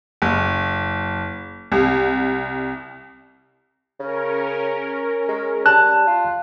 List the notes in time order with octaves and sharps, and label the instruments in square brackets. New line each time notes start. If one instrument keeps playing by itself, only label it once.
[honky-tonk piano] F#1
C2
[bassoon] C#3 [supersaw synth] C#4 A#4
[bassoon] G#3
[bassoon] G3 [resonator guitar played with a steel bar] A5 [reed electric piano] F#6
[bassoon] F4